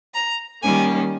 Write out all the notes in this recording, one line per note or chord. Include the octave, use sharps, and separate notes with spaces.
A#5
D#3 G3 A#3 C#4 G#5